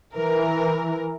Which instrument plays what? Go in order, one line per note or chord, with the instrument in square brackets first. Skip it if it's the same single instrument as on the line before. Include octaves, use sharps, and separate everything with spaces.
[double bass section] E3 [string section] A#4